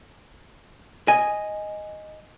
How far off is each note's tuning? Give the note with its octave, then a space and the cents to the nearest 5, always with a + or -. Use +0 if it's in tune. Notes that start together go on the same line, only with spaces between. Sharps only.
D#5 +0 G#5 +0